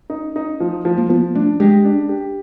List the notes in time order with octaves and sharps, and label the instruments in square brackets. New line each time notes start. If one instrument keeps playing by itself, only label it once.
[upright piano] D#4
D#4
F3
F3
[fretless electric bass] A#3
[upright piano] F3 [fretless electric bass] B3
[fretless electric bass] A3 [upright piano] D4
[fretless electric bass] G#3 [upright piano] G4
[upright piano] D4
G4